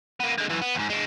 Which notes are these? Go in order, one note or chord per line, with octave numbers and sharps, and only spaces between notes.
A#3 B3
D3 G#3
F#2 E3
B3
D#2 G#2
G#3 D4